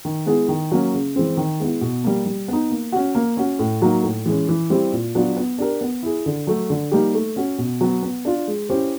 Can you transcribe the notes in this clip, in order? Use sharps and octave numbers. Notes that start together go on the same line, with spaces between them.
D#3
G#3 B3 E4 G#4
D#3
F#3 A#3 C#4
C#3
E3 G#3 C4
D#3
G#3 B3 E4
B2
G3 A#3
G3
B3 D#4
A#3
C#4 F#4
A#3
C#4 F#4
A2
F#3 A#3 D#4
A2
E3 G#3 C#4
E3
G3 C4 E4 G4
A#2
F#3 B3 D4 F4
B3
D4 G4 A#4
B3
E4 G#4
D3
F#3 A3
D3
G3 A#3 D#4 G4
A3
C#4 F#4
B2
F#3 B3
B3
D4 F4
G#3
C#4 E4 G4 C5